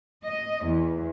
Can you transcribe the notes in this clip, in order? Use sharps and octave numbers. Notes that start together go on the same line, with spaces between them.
D#5
E2